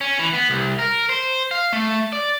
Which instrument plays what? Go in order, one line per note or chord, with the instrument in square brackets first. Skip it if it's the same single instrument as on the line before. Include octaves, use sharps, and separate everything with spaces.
[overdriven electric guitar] C#4
E3
B3
C2
A#4
C5
F5
A3
D5